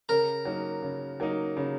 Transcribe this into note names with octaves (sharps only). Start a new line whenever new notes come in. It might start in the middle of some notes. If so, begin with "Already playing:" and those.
C#3 A#4
F#3 A#3 D#4
C#3
F#3 A#3 D#4
C#3